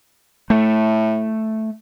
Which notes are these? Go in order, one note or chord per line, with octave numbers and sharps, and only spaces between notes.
A2 A3